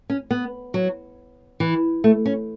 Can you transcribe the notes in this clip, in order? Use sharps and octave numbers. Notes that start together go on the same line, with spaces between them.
C#4
B3
F#3
E3
A3
C#4